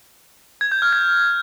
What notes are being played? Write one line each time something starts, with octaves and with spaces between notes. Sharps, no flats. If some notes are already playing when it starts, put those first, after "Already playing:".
G#6
G6
F6
G#6